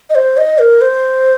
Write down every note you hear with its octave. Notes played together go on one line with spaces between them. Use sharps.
D#5
C5
D#5
A#4
C5